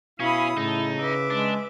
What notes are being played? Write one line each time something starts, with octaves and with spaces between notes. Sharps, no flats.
B2 C#4 E4 F5 B5 D#6
A2 C#3 D#4 A5
B4 E5 D6
G#3 D4